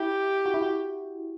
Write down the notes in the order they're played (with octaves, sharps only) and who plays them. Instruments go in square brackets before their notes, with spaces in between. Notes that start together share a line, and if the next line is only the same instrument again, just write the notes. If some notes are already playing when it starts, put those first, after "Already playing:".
Already playing: [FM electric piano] E4 [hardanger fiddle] G4
[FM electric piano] F#4
E4
F#4